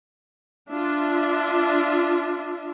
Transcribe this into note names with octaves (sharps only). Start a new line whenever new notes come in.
D4 F4 E5